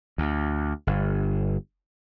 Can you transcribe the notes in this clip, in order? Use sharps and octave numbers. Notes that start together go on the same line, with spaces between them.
D2
G1